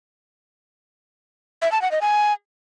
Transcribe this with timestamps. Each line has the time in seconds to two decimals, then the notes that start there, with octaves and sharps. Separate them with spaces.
1.62 E5
1.72 A5
1.82 F#5
1.92 D#5
2.01 G#5